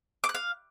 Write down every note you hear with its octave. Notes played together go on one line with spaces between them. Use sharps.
D6
F#6
F5